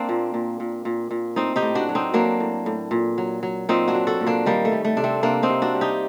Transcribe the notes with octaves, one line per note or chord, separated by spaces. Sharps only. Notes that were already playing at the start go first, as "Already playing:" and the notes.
Already playing: A#3 C4 D4
A#2
A#2
A#2
A#2
A#2
A2 C4 D#4
D#4 G4
A2
D4 F#4
F#3
C4 D#4
F#3 A#3 D4
A2
A2
A#2
F#3
F#3
A#2 C4 D#4
D4 F#4
F#3
F#4 A4
A#2
A#3 D4
D#3 G3 A#3
A3
G3
A3
C3 D4
A3 C4
C3 A#3 D4
C4 D#4
C3
D4 F#4
G3
D#4 G4